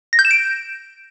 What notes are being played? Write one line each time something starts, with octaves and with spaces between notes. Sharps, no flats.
A#6
G6
E7
D7